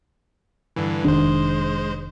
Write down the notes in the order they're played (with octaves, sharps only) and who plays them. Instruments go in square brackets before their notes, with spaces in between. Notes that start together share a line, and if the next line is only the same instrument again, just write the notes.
[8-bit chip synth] G2 D3 E3
[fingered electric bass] F1 D#3 D4 [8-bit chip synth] G#3 C5